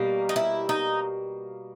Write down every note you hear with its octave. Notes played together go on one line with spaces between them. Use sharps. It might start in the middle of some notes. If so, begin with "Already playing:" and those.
Already playing: B2 G3 A#3
D#4
E4
D#4